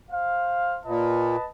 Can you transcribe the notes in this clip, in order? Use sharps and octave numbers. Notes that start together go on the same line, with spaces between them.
C5 F5
A#2 B4 D#5 A5